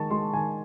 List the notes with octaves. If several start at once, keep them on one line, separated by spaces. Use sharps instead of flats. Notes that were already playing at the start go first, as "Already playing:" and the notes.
Already playing: D#3 G#3 A5 C#6
G#3 C6
D#3 G#5